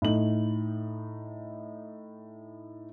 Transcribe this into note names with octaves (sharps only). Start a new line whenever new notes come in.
A2 D#4 F#7